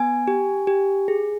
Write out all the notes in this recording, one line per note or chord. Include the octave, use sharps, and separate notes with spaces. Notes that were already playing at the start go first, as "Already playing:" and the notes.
Already playing: B3 G#5
G4
G4
G#4